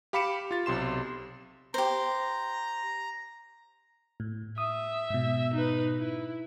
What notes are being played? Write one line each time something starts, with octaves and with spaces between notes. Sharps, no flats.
G4 F5 B5 D6 C#7 E7
F4 A6
B1 C3 C6 E7
G4 C5 A#5
A2
E5 D#6
G#2 B2
D#4 B4
E4